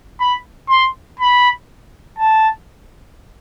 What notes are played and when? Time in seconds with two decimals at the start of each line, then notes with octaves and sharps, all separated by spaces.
0.20 B5
0.69 C6
1.19 B5
2.18 A5